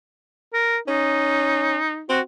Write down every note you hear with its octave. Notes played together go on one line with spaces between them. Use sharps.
A#4
C#4 D#4
C4 F#4